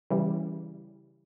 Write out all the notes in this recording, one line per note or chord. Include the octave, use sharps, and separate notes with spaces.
C#3 E3 G3